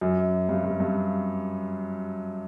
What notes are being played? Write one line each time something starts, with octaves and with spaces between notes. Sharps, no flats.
F#2
G2
G2
G2